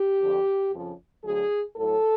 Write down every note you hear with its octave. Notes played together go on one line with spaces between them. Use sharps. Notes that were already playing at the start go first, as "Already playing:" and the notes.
Already playing: G4
F2 D3 F3
F2 C#3 F3
D2 D3 F#3 G#4
A2 F#3 A4